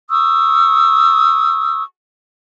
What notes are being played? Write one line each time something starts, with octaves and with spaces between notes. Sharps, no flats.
C#6 D#6 E6